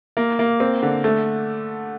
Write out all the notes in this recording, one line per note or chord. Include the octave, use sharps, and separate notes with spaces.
A#3
A#3
C4
D3
A3